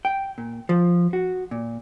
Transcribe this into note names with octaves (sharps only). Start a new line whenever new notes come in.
G5
A#2
F3
F#4
A#2